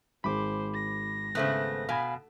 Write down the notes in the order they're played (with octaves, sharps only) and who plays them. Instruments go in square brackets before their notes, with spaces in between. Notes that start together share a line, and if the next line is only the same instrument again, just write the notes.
[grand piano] G#1 G#3 [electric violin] C5 [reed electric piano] B5 D6
[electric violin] A#6
[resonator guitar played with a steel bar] C#3 A3 B3 [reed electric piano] C5 E5 F#6
[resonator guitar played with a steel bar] B2 [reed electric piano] F5 G#5 B5